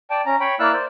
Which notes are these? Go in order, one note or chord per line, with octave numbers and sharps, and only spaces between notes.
D5 G5 A5
C#4 A#5
C#5 G5 B5
A#3 E4 D5 F5 E6 F#6
C5 D5